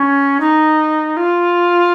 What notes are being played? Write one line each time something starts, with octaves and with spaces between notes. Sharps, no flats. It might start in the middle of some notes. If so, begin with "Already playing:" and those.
Already playing: C#4
D#4
F4